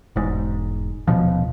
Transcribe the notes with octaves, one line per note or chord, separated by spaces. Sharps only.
E1 G#2
D#1 C2 B2 F3